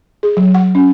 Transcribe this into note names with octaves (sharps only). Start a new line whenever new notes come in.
G#4
F#3
F#5
C#4